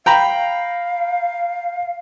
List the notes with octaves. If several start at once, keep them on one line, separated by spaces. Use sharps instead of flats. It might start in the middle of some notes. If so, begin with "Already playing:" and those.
F5 G5 A#5 B5